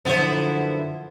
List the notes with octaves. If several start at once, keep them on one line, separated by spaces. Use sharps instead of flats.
F#2 D3 F3 B3 E4 C5